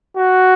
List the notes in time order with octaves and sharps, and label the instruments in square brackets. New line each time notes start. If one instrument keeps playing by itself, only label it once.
[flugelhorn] F#4